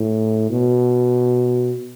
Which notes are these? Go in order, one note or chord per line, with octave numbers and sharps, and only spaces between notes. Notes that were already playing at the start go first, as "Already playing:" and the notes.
Already playing: A2
B2